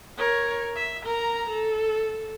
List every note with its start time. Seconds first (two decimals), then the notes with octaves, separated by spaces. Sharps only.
0.18 A#4 C#5
0.76 E5
1.05 A#4 A#5
1.50 A4